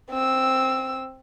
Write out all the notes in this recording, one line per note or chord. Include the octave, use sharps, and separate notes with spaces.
C4 E6